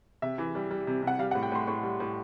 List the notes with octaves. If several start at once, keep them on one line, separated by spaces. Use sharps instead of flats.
C3 E5
E3
G3
G3
C3
C3
F#5
G3 F5
F#5
A2
G5
A2 C6
A2 C#6
G3
A2